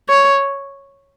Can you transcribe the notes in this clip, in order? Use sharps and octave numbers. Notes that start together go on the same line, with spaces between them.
C#5